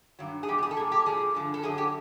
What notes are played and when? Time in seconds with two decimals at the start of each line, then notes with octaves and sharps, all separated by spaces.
0.19 G2 D#3 F#3
0.43 G#4
0.48 E2 B2 G3 G4
0.58 G4
0.63 G#4
0.71 A4
0.76 G3 G#4
0.79 A#2
0.92 G4
1.06 G#2 F3 G#4
1.35 G2 D3 F3
1.54 A4
1.63 F#2 D3 F#3 G#4
1.78 G4